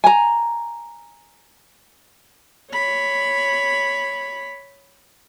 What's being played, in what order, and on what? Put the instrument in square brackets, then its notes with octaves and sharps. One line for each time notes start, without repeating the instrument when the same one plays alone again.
[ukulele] G#5 A#5
[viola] C#5 B5